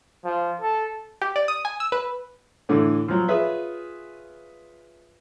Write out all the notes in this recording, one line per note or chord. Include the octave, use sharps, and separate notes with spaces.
F3
A4
G4
D5
D#6
G#5
E6
B4
A2 D3 E3
F3 F#3
F4 G#4 B4 C#5 E5